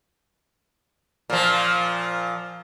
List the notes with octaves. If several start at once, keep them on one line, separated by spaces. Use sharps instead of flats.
A#2 F3